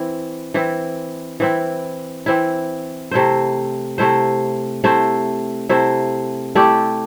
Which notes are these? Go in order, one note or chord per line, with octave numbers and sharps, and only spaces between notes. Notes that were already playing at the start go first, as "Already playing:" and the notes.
Already playing: E3 C4 E4
E3 C4 E4
E3 C4 E4
E3 C4 E4
C3 A3 E4 C5
C3 A3 E4 C5
C3 A3 E4 C5
C3 A3 E4 C5
A3 E4 G4 D5